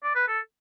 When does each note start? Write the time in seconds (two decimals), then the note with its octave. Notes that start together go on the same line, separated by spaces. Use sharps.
0.03 D5
0.15 B4
0.28 A4